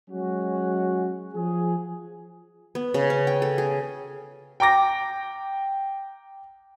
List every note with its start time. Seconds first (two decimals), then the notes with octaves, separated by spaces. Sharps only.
0.10 F#3 G#3 C#4 F#4
1.34 F3 G#4
2.75 B3
2.94 C#3
3.10 C#4
3.27 G5
3.42 A4
3.58 G#4
4.60 G5 A#5 D6 A#6